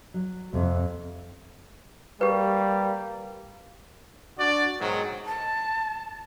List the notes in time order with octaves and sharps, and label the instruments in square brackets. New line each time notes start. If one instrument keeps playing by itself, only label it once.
[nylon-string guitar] F#3
[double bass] F2 [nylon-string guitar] C3
[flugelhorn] G3 [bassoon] A#3 [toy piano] G4 B4
[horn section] D4 F#4 D5
G#2 B2 D#3 F#3
[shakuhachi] A5